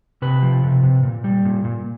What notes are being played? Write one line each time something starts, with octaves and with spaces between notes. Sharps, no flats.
C3 B4
F3
C3
C3
A#2
G3
A#2
A#2